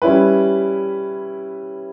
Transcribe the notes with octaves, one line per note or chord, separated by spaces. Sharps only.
G3 C#4 E4 B4